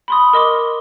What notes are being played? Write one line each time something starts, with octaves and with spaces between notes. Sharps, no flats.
B5 C6 D#6
A#4 D#5 C6 D6